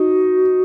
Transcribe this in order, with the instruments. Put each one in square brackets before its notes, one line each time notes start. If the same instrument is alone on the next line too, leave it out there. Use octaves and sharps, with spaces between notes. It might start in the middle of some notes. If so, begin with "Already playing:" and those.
Already playing: [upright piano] D#4 [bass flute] F#4